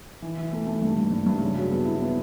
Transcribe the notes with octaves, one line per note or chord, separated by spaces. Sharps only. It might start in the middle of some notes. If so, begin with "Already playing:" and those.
E3
E3
A3
A3
G2
G2
G2
G2
C#3
F#3
B3
E4
B3